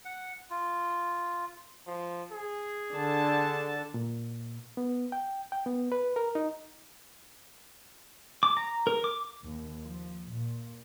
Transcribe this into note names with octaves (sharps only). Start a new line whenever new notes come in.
F#5
F4
F3
G#4
D3 A5
A#2
B3
G5
G5
B3
B4
A#4
D#4
D6
A#5
A#4
D6
D#2
F3
A#2